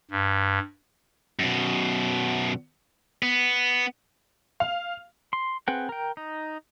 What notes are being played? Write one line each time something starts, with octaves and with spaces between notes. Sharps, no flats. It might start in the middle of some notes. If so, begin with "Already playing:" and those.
G2
F#2 B2
B3
F5
C6
C4 G#4 B4 F#5 G5
A#4 G5
D#4